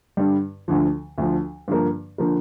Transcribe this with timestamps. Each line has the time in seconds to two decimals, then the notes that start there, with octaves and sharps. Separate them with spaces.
0.17 G2 D3 G3
0.68 D2 D3 F3
1.18 D2 D3 F3
1.68 G2 D3 F3 A#3
2.18 D3 F3 A#3